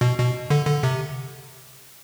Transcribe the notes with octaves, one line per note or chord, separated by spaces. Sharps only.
B2
B2
D3
D3
C3